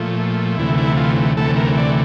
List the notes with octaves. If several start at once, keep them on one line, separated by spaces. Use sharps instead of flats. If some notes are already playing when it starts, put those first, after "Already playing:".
Already playing: A#2 F3 A3
D2 C3 E3 A3 E4
E4
F4
D2 C3 E3 A3 A4
A#4
D5